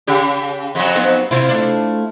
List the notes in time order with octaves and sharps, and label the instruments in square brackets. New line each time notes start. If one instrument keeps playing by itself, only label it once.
[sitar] C#3 G4
F2 F#3
[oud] B3 C4 D#4
[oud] C3 C4 [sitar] E4 F4
[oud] A3 D4